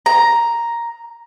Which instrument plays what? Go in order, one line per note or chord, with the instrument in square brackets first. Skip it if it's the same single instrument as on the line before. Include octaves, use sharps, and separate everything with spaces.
[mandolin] A#5